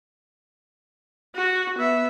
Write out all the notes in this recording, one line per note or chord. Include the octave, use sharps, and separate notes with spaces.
F#4
B3 E5